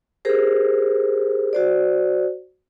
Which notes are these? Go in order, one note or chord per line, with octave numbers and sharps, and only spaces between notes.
G4 G#4 A#4 C5
F#4 C5 D5